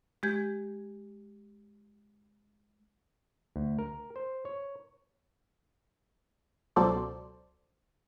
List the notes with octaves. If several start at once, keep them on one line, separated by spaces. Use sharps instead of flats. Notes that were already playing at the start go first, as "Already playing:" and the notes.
G#3 G4 G6 G#6
D2
A#4
C5
C#5
C#2 B2 F#3 A4 C5 D5